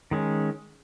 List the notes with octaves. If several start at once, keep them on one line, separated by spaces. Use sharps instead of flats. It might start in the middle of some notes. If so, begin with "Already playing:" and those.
D#3 G#3 C#4